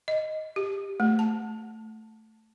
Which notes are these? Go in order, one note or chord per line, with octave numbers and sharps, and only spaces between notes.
D#5
G4
A3
A5